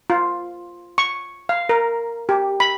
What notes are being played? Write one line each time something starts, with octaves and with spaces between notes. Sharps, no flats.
F4
C#6
F5
A#4
G4
B5